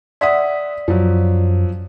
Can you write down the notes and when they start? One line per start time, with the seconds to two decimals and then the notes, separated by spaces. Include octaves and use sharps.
0.21 D5 E5 F#5 C6 D#6 B6
0.88 F#2 F3 F#3